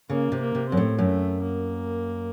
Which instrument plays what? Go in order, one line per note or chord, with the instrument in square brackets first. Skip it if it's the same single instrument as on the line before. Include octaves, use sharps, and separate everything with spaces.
[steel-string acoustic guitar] C#3 [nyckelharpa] A#3
[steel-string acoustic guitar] C3
[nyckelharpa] A#3
[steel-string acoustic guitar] C3
[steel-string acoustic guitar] F#2 [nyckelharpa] C4
[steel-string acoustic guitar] A2
[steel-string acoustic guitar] F#2 [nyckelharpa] A3
[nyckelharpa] A#3